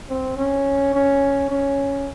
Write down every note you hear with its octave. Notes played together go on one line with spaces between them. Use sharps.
C4
C#4
C#4
C#4